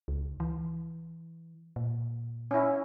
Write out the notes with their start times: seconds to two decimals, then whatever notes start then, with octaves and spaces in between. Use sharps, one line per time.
0.08 C#2
0.40 E3
1.76 A#2
2.51 C#4 E4